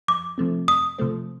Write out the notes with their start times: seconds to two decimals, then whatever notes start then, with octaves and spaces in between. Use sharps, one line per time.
0.08 F2 D6
0.38 C3 F3 A3 C4
0.68 F2 D#6
0.98 C3 F3 A3 C4